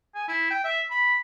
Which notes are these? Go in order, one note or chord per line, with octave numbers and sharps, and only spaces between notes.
G#5
E4
G5
E5
B5